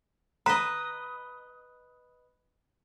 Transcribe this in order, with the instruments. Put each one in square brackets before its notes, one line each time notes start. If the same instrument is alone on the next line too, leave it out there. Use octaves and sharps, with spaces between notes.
[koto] B4 D#5 [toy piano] A#5